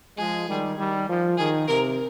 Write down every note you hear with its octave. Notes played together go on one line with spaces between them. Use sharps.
F3 G#3 G#4
D#3 G3
D#3 G3
F3
D#3 G#4
C3 A#4